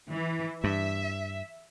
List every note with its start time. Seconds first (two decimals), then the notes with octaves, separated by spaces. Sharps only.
0.11 E3
0.64 G2 E5